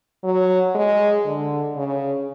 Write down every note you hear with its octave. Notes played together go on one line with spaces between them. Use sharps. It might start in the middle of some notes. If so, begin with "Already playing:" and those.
F#3
G#3
D3
C#3